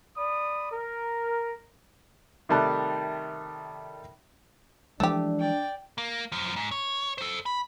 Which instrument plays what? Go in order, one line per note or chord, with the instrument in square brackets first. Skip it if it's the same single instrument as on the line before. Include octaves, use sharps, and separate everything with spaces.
[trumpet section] D5 B5 D#6
A#4
[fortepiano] C3 D#3 G3 A3 A5 F#6
[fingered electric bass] E3 F3 G#3 [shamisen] A3 G4 [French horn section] D4
[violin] D5 G5
[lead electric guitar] A#3
F#2 F3
G#2
C#5
A4 C5
B5